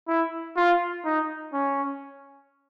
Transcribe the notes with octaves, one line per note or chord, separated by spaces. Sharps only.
E4
F4
D#4
C#4